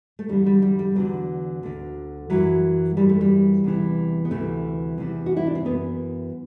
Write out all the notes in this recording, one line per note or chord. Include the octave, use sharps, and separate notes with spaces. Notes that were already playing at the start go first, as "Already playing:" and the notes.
A3
E2 D3 G3
G3
G3
G3
E2 D3 F#3
D2 D3
F#2 E3 F#3
F#2 E3 G3
A3
G3
E2 C3 E3
B3
D2 C3 E3 A3
E2 C3 E3
F#4
E4
D4
C4
F#2 E3 B3